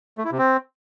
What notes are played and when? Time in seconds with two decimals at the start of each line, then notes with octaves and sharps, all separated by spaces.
0.18 A3
0.25 E4
0.31 C3
0.38 C4